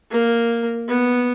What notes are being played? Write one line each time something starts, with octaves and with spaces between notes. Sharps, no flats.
A#3
B3